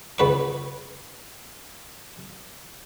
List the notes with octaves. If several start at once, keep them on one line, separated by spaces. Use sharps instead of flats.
C#2 B4 C#6